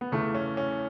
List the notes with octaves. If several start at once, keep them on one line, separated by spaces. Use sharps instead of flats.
B3
E2 C#3 E3 A3
C#4
C#4